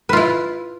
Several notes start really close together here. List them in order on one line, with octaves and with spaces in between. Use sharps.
B4 F4 E4